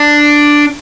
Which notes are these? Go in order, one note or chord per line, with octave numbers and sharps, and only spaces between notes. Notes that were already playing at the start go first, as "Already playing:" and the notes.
Already playing: D4